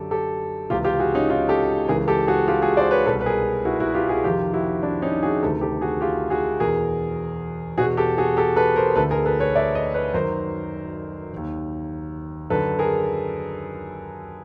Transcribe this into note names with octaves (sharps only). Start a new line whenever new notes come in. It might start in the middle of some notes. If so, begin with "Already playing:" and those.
Already playing: F#2 D3 G4 A4
G4 A4
C#2 C3 E3 F4 G4
F4 G4
F#4 G#4
C#4 D#4
D#4 F4
G4 A4
C#2 C#3 E3 G#4 A#4
G4 A4
F#4 G#4
F4 G4
F#4 G#4
C5 D5
B4 C#5
C2 B2 A4 B4
B4
G#4 A#4
E4 F#4
E4 F#4
F4 G4
F#4 G#4
F2 C3 D#3 F4 G4
E4 F#4
D4 E4
C#4 D#4
F#4 G#4
D2 C3 D#3 G4 A4
G4 A4
F#4 G#4
F4 G4
F#4 G#4
E2 B2 G#4 A#4
E2 B2 F#4 G#4
G4 A4
F#4 G#4
G4 A4
A4 B4
A#4 C5
D2 D3 A4 B4
G#4 A#4
A4 B4
B4 C#5
D5 E5
C#5 D#5
B4 C#5
F#2 D#3 A#4 C5
D#2 D#3
F#2 D3 A4 B4
G#4 A#4